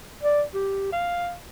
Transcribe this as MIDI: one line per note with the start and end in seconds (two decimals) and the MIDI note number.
0.23 0.42 74
0.54 0.89 67
0.92 1.34 77